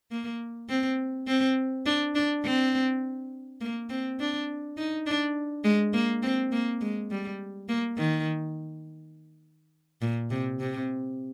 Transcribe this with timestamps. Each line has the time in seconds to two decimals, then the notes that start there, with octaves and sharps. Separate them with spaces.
0.11 A#3
0.69 C4
1.27 C4
1.86 D4
2.15 D4
2.44 C4
3.61 A#3
3.89 C4
4.20 D4
4.77 D#4
5.07 D4
5.64 G#3
5.93 A#3
6.23 C4
6.52 A#3
6.81 G#3
7.11 G3
7.68 A#3
7.98 D#3
10.02 A#2
10.31 C3
10.60 C3